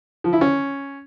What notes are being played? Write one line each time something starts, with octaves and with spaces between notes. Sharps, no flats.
F3
E4
C#4